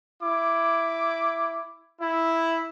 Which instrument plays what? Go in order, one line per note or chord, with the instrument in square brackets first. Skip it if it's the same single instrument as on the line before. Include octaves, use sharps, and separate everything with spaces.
[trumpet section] E4 D6
E4